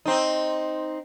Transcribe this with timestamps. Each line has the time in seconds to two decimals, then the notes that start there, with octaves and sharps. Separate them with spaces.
0.06 C4 D#4